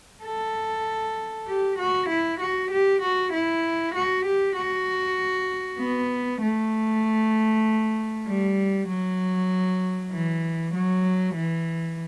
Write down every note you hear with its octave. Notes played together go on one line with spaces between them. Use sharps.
A4
G4
F#4
E4
F#4
G4
F#4
E4
F#4
G4
F#4
B3
A3
G3
F#3
E3
F#3
E3